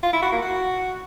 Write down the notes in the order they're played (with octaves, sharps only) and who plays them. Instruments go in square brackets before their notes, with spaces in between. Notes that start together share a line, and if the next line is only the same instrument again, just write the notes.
[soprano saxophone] F4
E4
F#4
A#3
F#4